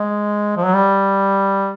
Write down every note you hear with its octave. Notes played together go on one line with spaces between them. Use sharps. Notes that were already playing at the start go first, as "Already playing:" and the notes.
Already playing: G#3
F3
F#3
G3